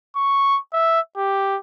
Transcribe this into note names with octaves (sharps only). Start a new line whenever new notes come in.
C#6
E5
G4